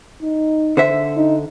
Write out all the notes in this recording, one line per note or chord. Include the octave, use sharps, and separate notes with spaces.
D#4
D3 C5 E5
D#4